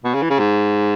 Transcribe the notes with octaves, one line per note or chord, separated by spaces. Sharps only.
B2
C#3
E3
C#3
G#2